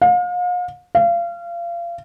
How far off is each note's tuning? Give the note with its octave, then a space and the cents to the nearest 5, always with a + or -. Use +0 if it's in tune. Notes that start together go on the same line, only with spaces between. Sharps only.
F5 +40
F5 -30